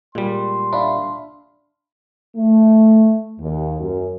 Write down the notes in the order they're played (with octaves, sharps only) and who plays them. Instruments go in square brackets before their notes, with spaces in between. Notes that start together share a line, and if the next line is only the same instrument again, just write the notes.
[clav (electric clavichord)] A#2 G3 [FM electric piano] G#3 [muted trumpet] C6
[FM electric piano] D4 [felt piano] E5 F5 B5
[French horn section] A3
D#2
F#2